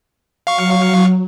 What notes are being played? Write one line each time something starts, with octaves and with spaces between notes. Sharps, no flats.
F#3 F5 C#6